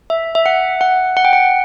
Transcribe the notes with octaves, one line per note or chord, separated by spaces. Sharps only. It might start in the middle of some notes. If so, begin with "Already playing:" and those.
E5
E5
F#5
F#5
F#5
G5
F#5